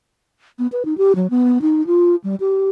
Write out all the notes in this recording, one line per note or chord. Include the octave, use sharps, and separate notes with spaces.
B3
B4
D#4
G4
F#3
B3
D#4
F4
G3
G4